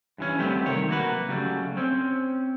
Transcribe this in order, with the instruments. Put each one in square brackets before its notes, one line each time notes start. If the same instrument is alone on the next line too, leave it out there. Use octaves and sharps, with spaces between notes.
[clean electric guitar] G2 E3 C#4
G3 A3 B3 C4 G4
C3 D#3 C#5
F#3 A#3 F#4 B4
C#3 F#3 G3 A3
C4 C#4